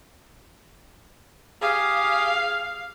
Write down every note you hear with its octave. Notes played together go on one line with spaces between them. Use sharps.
G4 G#4 F5